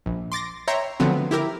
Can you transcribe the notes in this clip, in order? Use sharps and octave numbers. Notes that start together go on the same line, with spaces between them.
A#1
C6 D6 A6 A#6
C#5 E5 G5 A#5 C6
D3 F3 F#3 A3 B3 C4
E4 G4 A#4